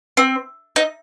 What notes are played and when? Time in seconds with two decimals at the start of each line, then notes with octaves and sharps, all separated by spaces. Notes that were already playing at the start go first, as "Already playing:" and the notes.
0.17 C4
0.76 D#4